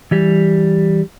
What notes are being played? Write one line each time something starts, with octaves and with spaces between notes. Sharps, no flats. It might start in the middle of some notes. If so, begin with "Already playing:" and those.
E3 G3 G4